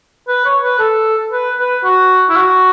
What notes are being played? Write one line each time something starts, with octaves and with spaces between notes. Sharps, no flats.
B4
C#5
B4
A4
B4
B4
F#4
E4
F#4